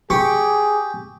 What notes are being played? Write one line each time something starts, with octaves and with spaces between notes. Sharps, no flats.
G4 G#4 C#6 D6